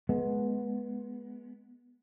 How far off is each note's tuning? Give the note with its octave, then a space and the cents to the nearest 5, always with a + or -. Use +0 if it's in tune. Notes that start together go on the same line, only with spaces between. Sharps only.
G#3 +20 B3 -15